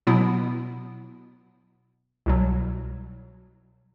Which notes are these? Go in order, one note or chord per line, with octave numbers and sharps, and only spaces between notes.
B2 F#3 B3 E4
C2 B2 F#3